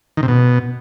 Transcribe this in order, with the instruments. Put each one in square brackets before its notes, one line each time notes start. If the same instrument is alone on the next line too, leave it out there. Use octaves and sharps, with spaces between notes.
[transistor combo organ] D#3
C3
B2